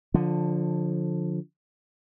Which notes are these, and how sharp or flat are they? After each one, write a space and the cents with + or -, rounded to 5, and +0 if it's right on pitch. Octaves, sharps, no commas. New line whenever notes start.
D3 +0 F3 +20